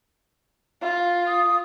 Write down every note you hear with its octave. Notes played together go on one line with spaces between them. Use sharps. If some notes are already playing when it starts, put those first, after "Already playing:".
F4
D#6